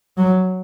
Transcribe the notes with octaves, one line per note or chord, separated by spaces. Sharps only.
F#3